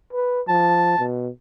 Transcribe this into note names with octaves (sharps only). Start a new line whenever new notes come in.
B4
F3 A5
B2